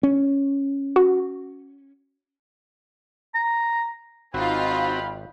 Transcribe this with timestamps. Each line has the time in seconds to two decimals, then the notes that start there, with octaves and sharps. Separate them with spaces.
0.03 C#4
0.96 F#4
3.34 A#5
4.34 G#1 C4 D#4 F4 F#4 F5 G5 B5